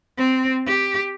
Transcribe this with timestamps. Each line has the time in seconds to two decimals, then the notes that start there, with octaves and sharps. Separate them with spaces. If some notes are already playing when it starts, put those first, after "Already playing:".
0.17 C4
0.66 G4